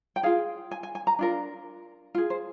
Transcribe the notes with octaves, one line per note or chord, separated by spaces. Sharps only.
G5
F4 G#4 F5
G#5
G#5
G#5
A#5
D4 F4 A#4
F4 G#4
C5